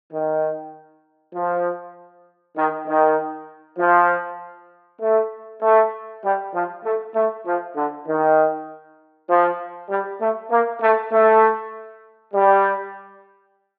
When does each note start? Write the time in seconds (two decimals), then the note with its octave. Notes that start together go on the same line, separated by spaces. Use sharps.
0.12 D#3
1.34 F3
2.57 D#3
2.87 D#3
3.79 F3
5.01 A3
5.62 A3
6.23 G3
6.54 F3
6.84 A3
7.14 A3
7.46 F3
7.75 D3
8.07 D#3
9.29 F3
9.90 G3
10.20 A3
10.51 A#3
10.82 A3
11.12 A3
12.34 G3